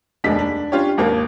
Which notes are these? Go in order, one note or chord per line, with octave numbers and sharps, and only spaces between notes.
F1 D#2 G#3 D4 B6
D4
C#4 D4 F4 G4 C#5
G#1 D#2 A#3